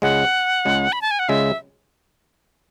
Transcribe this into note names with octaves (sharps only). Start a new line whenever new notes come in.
C#2 C#3 G#3 F#5
C#2 C#3 G#3
B5
A5
G#5
F#5
C#2 C#3 G#3 E5